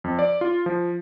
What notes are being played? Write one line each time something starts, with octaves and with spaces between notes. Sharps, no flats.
F2
D5
F4
F3